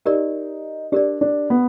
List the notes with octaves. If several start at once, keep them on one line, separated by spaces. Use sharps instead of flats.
D#4 G4 A#4 D5
D4 G4 A#4 D5
D4
B3